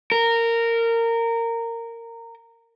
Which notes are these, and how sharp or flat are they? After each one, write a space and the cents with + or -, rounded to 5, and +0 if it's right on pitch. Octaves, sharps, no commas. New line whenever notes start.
A#4 -15